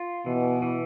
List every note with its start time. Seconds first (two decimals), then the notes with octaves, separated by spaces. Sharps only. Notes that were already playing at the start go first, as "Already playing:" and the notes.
Already playing: F4
0.25 B2 E3
0.62 E3